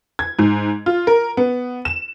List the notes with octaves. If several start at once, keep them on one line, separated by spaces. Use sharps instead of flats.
G#6
G#2
F4
A#4
B3
E7